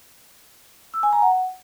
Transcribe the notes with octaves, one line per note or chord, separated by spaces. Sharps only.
E6
G#5
A#5
F#5